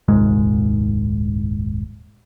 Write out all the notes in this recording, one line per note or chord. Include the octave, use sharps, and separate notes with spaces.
D#1 C2 G#2 G#3